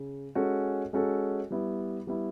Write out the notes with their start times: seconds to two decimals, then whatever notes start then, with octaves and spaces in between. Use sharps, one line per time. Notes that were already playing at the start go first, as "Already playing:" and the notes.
Already playing: C#3
0.35 G#3 C#4 F#4 A4
0.93 G#3 C#4 F#4 A4
1.50 G3 B3 E4
2.07 G3 B3 E4